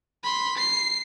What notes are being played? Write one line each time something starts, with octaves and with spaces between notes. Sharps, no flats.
B5 C6
C7